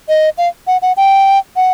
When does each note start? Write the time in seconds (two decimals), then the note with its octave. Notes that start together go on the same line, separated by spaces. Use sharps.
0.09 D#5
0.38 F5
0.67 F#5
0.82 F#5
0.97 G5
1.56 F#5